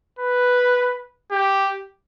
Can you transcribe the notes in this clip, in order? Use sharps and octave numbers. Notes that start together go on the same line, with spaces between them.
B4
G4